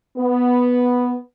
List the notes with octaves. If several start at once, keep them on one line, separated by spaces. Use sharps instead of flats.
B3